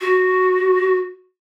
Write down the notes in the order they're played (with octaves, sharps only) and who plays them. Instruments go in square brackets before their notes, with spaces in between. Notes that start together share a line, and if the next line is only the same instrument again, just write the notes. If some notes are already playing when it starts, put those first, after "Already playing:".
[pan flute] F#4